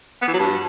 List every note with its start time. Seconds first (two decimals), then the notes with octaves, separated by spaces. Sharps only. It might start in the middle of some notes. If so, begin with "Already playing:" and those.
0.22 B3
0.28 E3
0.33 F#3
0.39 G2